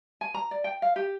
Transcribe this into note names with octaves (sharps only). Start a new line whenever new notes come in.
G#5
A#5
D5
G5
F5
G4